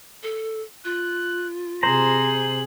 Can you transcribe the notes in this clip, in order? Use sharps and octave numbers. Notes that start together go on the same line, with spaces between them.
A4
F4 F#6
C3 G#4 C5 A#5 F#7